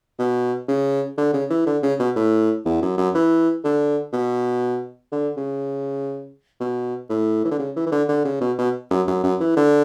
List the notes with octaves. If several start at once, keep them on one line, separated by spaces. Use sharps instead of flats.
B2
C#3
D3
C#3
E3
D3
C#3
B2
A2
E2
F#2
F#2
E3
D3
B2
D3
C#3
B2
A2
E3
D3
C#3
E3
E3
D3
D3
C#3
B2
B2
F#2
F#2
F#2
E3
D3